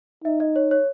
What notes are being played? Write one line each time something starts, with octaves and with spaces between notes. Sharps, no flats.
D#4 E5
D#5
C#5
C#5